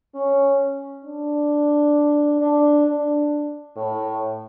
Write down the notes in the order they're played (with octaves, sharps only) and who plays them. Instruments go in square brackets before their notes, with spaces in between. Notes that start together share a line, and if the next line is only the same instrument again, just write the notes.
[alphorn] C#4
D4
D4
D4
A2